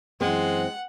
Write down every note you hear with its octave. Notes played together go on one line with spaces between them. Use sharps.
F#2 E3 G#3 C4 F#5